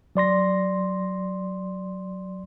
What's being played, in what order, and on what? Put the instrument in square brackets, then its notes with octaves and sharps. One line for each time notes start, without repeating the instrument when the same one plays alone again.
[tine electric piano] F#3 D5 C6 A#6